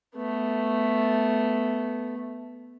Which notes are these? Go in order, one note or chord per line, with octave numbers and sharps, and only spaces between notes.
A3 B3